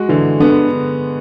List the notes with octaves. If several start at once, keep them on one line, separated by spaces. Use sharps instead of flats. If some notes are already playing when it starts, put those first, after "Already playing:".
Already playing: G#3 F#4
D3 E3
D3 B3